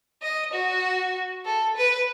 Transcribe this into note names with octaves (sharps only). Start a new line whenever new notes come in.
D#5
F#4
A4
B4